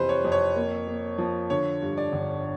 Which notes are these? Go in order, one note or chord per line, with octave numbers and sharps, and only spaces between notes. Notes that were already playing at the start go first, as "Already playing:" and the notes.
Already playing: F2 C3 E3 B4 C5
C#5
F2
C#5
A#3
A#3
F3
D3 C#5
G2
D5
G1